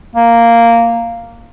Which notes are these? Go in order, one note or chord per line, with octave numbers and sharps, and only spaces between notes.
A#3